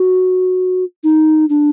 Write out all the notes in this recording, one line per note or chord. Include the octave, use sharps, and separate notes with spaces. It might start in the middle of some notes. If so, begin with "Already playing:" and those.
Already playing: F#4
D#4
D4